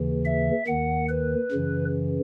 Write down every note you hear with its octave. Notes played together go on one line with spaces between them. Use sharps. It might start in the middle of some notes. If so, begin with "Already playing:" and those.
Already playing: D#2 C#3 E3
E5
D#2 D#3 F#5
B4
F#2 C#3 E3